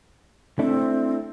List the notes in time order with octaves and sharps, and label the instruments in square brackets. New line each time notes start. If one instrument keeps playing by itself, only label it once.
[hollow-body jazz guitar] A3 D4 E4 [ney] C4